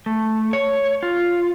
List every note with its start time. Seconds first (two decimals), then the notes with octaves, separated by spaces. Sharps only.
0.06 A3
0.53 C#5
1.03 F4